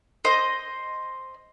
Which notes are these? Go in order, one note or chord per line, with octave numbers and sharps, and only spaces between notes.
C5 D#5